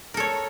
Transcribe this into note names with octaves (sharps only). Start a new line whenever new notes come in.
A4 A#4 C#5